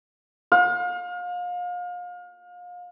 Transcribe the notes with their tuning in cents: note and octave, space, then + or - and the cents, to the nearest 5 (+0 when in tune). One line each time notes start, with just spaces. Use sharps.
F5 +35